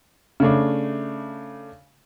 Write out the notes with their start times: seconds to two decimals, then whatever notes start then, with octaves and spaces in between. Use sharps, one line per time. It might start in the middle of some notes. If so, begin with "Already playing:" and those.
0.40 C#3 A3 D4